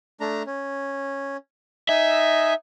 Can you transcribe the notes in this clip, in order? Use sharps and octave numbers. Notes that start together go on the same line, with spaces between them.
A3 D4 A#5
C#4
D#4 D#5 E5 G#5